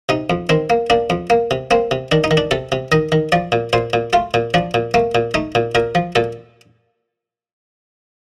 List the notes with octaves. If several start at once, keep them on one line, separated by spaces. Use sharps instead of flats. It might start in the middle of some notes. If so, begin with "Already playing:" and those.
C3 D#4
F2
D#3 C4
A#3
A#3 D4
F2
A#3
C3
A#3 C4
C3
D#3 D4
D#4
D#3
D4
C3 A4
C3
D#3 D#5
D#3
F3 D5
A#2
A#2 C5
A#2
A3 F4
A#2
F3 D4
A#2
A3 A#3
A#2
A3 D#4
A#2
A#2 A#4
F3
A#2 A4